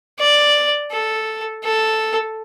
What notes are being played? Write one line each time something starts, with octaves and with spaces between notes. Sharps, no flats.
D5
A4
A4